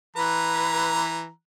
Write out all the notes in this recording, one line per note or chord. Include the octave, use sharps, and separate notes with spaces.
E3 B4 A#5